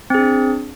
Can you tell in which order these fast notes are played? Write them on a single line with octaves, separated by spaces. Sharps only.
C4 G#4 D4